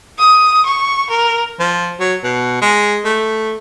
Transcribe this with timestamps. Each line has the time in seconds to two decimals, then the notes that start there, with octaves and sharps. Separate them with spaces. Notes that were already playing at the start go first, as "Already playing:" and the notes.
0.19 D#6
0.66 C#6
1.10 A#4
1.59 F3
1.99 F#3
2.24 B2
2.62 G#3
3.05 A3